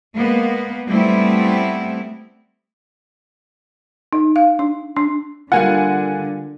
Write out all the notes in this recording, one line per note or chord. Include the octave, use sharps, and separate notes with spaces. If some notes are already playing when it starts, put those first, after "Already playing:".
G#3 A#3 B3
G3 A3 B3 C4 E4
D#4
F5
D4
D4
D3 G3 A#3 F4 F#5 G#5